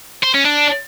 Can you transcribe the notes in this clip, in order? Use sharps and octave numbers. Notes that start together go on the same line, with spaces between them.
C5
C#4
D4